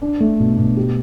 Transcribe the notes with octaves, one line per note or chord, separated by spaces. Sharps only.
D4
A3
B2
B2
G4